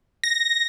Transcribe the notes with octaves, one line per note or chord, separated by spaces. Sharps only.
A#6